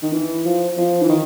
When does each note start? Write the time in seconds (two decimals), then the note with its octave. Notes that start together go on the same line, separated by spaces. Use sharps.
0.03 D#3
0.13 E3
0.45 F3
0.77 F3
1.02 E3
1.09 D#3